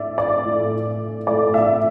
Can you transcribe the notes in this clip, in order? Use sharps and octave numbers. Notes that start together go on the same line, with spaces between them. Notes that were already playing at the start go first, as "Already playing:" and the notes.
Already playing: A2 D5 E5
D5
A2 A3
A2 A3 D5
E5